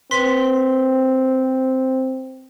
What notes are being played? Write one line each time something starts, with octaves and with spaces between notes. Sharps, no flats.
C4 B4 C6 B6